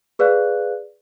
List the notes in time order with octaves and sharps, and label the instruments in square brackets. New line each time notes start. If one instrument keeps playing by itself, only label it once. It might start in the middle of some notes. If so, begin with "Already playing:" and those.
[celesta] G#4 B4 D5 F5 F#6